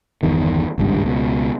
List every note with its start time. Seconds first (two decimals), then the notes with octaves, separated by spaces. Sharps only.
0.23 G1 E2 D#3
0.78 G#1 C#2 G2 C3
1.02 C#2 B2